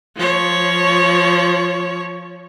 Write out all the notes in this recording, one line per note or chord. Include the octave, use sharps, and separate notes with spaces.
F3 C#5